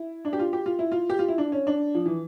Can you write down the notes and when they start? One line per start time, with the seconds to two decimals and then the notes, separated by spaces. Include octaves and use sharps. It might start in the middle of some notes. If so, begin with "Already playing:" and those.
Already playing: E4
0.25 D4
0.33 G4
0.39 F4
0.53 G4
0.66 F4
0.79 E4
0.92 F4
1.10 G4
1.19 F4
1.28 E4
1.38 D4
1.52 C#4
1.67 D4
1.95 F3
2.06 E3